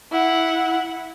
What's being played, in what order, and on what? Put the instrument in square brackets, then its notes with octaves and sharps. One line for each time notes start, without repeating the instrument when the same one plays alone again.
[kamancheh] E4 F#5